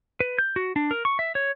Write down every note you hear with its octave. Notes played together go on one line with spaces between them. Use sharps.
B4
G6
F#4
D4
A#4
C#6
E5
C#5